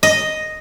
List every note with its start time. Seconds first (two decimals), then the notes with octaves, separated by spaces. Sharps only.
0.03 D#5